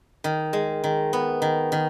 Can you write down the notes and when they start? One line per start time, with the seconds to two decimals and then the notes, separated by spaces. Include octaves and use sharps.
0.24 D#3
0.53 G#3
0.84 D#3
1.13 B3
1.42 D#3
1.72 D#3